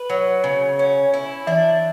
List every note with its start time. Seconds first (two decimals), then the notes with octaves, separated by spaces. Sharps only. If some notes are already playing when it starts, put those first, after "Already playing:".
Already playing: B4
0.10 F#3
0.44 C#3
0.79 C#4
1.14 E4
1.47 E3 D4